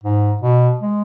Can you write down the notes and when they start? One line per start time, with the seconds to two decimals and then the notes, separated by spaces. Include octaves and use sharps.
0.04 G#2
0.42 B2
0.81 G#3